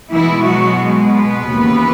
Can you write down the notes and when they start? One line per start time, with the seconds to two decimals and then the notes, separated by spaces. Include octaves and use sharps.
0.11 B2 E3 G#3 B3 E4
0.45 F#3 F#4
1.13 B3 B4
1.48 D#2 C#3 E3 A#3